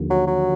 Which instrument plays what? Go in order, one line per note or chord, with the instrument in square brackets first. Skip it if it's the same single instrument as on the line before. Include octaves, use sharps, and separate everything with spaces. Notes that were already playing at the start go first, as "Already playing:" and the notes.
Already playing: [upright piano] D#2 D3 F3 A#3
[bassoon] F#3
F#3